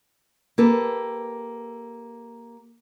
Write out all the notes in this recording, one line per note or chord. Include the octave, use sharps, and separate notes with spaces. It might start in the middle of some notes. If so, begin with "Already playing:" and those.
A#3 G4 A4 B4